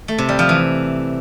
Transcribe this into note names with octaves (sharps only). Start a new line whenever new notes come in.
A3
C3
G3
F3
E3